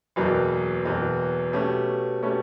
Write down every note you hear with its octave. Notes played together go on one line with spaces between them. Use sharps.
F#1 E2 B2 F#3
F#1 E2 B2 F#3
B2 A3 C#4 G4
B2 A3 C#4 G4